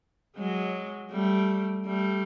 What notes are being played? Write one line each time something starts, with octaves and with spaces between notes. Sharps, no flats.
F#3 G#3
G3 A3
G3 A3